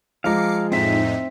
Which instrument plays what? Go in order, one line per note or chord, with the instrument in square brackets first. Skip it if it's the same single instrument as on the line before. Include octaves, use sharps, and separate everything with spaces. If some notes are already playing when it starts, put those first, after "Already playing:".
[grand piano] F3 G#3 [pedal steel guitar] F5 A#5 [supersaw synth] D6 C7 C#7
[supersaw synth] F2 A2 D#4 [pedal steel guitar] C4 E5